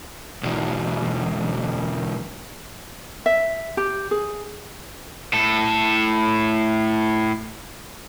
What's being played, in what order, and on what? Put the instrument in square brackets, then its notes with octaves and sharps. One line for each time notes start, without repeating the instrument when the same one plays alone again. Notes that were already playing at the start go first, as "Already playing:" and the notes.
[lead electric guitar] B1 E2
[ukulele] E5
G4
G#4
[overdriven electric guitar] A2 A4